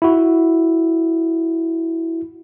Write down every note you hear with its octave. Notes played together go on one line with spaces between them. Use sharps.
E4 F#4